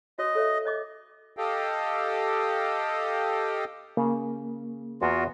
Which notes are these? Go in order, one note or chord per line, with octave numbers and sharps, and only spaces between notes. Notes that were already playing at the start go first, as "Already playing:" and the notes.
F#4 C#5 D#5
A4 C#5 E5
C#5 D#5 D6
G4 A4 D#5 F5 G5
C#3 A#3
E2 B3 F4 F#4 A#5